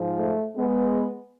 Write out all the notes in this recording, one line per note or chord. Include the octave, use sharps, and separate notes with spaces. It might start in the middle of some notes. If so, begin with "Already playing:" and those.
Already playing: G#2 F3
A3
G#3 B3